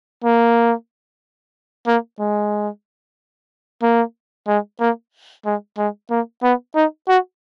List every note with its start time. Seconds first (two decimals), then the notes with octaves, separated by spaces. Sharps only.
0.25 A#3
1.87 A#3
2.20 G#3
3.82 A#3
4.48 G#3
4.80 A#3
5.45 G#3
5.78 G#3
6.11 A#3
6.43 B3
6.75 D#4
7.08 F#4